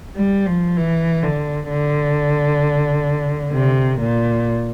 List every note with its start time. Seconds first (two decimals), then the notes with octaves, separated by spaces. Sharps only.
0.16 G3
0.47 F3
0.77 E3
1.23 D3
1.69 D3
3.53 C3
4.00 A#2